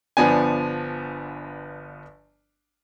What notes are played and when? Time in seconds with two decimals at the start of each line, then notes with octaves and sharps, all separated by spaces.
0.17 G1 F3 B3 D4 G#5